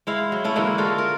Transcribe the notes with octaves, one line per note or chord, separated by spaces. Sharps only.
G#3 E4 F5
F#3
A3 C#4 E4
D3 E3 G#3 A#3
F4 F#4 A4 F5
A#4